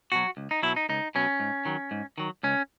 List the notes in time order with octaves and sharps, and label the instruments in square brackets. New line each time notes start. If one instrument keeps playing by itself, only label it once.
[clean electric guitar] B2 F#3 F#4
C#2
D#4
B2 F#3 E4
D#4
C#2 D#4
B2 F#3 C#4
G#2
D#3 F#3
G#2
D#3 F#3
C#2 C#4